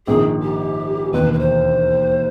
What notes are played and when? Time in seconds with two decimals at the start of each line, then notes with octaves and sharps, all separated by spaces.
0.07 A#1 G#2 D#3 G#4
0.43 G4
1.12 E1 D#2 D#3 B4
1.33 B4
1.39 C5